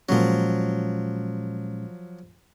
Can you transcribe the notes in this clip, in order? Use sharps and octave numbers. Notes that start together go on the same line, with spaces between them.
A#2 F3 F#3 G#3 C#4